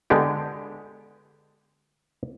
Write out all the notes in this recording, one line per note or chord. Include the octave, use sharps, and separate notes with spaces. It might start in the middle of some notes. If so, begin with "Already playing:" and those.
D3 G#3 B3 G4